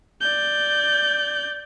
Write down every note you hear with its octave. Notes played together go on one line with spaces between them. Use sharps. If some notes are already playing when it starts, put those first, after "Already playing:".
D5 G6